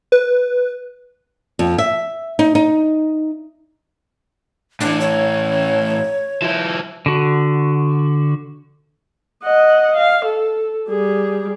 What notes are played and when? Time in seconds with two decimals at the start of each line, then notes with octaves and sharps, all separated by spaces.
0.12 B4
1.59 F2
1.78 E5
2.39 D#4
2.55 D#4
4.81 A2 E3 D4
5.01 C#5
6.42 F3 E4
7.06 D3 F#4
9.44 D#5 F#5
9.96 F5
10.25 A4
10.90 G3 G#4